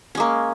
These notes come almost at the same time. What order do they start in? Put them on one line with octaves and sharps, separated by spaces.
C#4 G#3 A#3